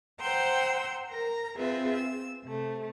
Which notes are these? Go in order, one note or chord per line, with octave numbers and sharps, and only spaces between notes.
C5 F#5 G5 A#5 C6 E6
A#4 A#5
C4 F4 G#4 B4 E5
E6
C3 A3